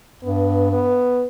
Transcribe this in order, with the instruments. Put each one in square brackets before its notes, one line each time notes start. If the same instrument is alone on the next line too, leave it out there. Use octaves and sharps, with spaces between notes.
[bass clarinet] G2 [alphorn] B3
[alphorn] B3